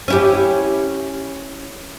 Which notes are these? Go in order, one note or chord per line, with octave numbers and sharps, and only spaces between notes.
C#4 E4 G4